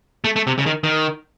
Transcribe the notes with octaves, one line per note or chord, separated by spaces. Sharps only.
A3
A3
C3
C#3
D#3
D#3